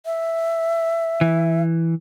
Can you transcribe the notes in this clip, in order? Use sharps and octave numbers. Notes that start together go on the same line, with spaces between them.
E5
E3